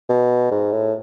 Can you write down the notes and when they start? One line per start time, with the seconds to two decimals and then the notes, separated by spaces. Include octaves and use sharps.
0.09 B2
0.51 G#2
0.72 A2